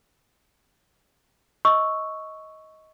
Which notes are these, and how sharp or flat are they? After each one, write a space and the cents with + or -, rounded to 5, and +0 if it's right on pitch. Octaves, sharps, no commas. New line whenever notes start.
D#5 +20 C#6 +0 E6 +0